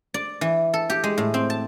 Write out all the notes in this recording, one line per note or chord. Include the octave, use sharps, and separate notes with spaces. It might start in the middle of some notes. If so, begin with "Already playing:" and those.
D5
E3
A4
G4
G#3
A2
C4
A5